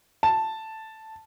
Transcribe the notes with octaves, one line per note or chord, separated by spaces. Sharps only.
A5